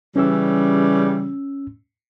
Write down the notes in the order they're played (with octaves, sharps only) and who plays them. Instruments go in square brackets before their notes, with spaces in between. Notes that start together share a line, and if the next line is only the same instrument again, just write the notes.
[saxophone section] C#3 E3 G3 [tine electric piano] C#4 E6